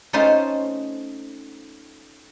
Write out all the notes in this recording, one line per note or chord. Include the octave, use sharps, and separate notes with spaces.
A3 C#4 D#4 F4 C5